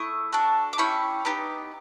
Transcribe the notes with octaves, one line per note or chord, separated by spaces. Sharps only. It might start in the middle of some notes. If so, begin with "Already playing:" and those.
Already playing: A3 E4 C#6 D#6
D4 F#4 A4
D6
C#4 E4 G4 B5 C#6
B3 D#4 G4